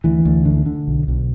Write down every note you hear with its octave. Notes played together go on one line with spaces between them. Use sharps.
D2 E3
D2
D3
D3
B1
B1